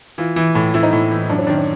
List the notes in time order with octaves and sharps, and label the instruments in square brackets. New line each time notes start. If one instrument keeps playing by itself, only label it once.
[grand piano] E3 [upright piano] F4
[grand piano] E3
A2
[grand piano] A2 [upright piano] E4
[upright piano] D#4
[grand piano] A2 [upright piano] E4
[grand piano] E3
[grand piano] F#2 [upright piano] D4
[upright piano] C#4
[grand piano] D#3 [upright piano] D4
[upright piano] C#4